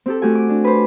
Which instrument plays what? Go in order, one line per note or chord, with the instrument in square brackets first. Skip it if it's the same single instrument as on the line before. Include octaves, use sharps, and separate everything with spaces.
[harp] C4 G4 A4
A3 F#4 G4 G#5
D6
D4
B4 C5